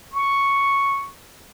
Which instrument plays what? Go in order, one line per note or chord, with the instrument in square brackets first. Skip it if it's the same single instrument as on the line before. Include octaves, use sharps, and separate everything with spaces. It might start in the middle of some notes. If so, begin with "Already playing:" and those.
[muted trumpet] C#6